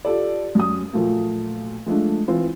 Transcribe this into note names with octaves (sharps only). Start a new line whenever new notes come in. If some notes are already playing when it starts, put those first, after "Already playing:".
F4 G4 A4 D5
F#2 D#6
A#2 F3 F#3 A3 A#3
F3 G#3 A3 D4
E3 C4 F4